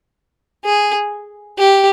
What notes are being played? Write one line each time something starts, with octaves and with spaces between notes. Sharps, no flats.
G#4
G4